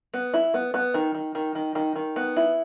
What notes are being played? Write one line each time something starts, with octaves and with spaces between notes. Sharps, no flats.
B3
E4
B3
B3
D#3
D#3
D#3
D#3
D#3
D#3
B3
E4